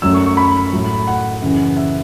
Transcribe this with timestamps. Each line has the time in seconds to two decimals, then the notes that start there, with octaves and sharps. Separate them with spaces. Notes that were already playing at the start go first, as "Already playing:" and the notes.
0.02 F#2 F#3 A3 E6
0.14 C#6
0.26 C#6
0.37 B5
0.73 A2 F#3 A3
1.07 F#5
1.42 F#2 C#3 E3
1.77 E5